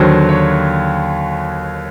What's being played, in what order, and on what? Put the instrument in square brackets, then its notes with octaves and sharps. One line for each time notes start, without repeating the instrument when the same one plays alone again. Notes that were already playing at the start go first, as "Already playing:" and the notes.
Already playing: [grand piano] D#2 D3 F#3 C5
C#5